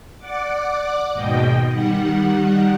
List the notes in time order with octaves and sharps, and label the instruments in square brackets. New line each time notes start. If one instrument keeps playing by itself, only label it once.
[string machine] D5 F#5 D6
D#2 G#2 B2 D#5 G5
D#3 G3 F#5